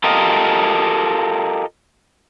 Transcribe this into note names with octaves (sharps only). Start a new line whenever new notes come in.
F4 G4 A4 A#4 D#5 F5